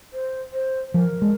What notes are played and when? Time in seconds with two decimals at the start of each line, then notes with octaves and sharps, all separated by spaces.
0.13 C5
0.53 C5
0.94 F3 A#4
1.22 G#3